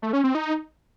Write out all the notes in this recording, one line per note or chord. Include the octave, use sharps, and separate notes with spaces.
A3
C#4
C4
D#4